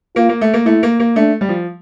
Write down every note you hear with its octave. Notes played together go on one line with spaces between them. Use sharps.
A#3 F4
A#3
A3
A#3
A3 E4
A#3
A#3
A3 D4
G3
F3